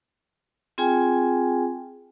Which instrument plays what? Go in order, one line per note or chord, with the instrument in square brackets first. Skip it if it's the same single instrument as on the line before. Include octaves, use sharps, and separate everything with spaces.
[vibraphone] C4 F4 G#4 G5 G#5